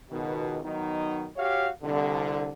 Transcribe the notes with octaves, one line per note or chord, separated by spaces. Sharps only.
C#2 B2 D#3
D#3 F#3 B3 D#4
F#4 G4 C#5 F5
C2 D3